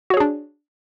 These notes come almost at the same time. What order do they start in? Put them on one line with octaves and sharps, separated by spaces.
F#4 C#5 G#4 D4